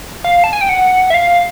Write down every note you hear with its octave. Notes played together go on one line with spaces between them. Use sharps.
F5
A5
G#5
G5
F#5
E5
F5